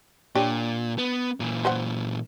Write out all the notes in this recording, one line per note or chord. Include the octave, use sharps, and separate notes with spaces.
A#2 D4 G4 C#5
B3
A#2 E3
B4 C5 F#5